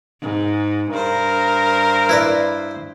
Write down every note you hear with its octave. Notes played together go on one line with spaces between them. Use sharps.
G#2
G2 A#4 C5
E4 B4 D5